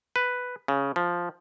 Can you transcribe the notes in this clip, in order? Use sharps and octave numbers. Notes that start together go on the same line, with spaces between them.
B4
C#3
F3